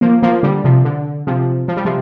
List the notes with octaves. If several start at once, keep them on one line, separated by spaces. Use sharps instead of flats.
F3 A#3
F3 A#3
D3 G3
C3 F3
D3
C3 F3
F3
G3
C3 F3